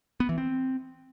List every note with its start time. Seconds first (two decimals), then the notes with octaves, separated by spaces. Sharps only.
0.20 B3
0.29 E3
0.38 C4